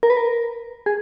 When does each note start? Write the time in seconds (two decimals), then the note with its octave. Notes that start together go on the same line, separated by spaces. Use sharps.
0.03 A#4
0.10 B4
0.17 A#4
0.86 G#4